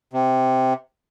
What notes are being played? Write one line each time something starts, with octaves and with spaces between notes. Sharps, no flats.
C3